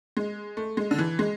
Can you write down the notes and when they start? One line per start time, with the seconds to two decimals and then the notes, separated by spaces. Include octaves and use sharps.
0.17 G#3
0.57 A3
0.77 G#3
0.91 D3
0.98 E3
1.19 G#3